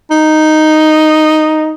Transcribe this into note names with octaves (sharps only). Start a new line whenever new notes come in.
D#4